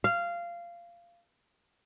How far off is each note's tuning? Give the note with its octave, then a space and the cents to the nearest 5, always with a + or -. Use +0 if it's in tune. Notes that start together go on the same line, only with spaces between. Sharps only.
F5 -15